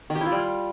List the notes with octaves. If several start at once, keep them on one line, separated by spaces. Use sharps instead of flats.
D#3
G4
E4
F4
G3